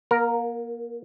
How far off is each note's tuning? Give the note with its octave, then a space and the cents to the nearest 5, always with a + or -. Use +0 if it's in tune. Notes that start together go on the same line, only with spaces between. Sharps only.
A#3 +30 A#4 +0